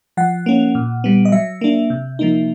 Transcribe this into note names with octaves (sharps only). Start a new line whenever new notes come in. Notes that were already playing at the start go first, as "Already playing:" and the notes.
F3 F#5
A#3 C#4
A#2
G3 B3
D#5
F#3 E5
A#3 D4
C3
F3 A#3 D#4